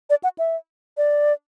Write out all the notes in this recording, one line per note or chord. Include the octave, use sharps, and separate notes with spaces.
D5
F#5
E5
D5